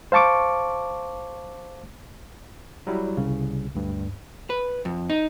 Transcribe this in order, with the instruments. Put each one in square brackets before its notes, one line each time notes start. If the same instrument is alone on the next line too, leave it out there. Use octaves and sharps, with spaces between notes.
[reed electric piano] C5 F5 A5 C#6 D6
[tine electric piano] F#3 G3 E4
C2 C#3
D2 G2
[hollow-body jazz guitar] B4
F2
D#4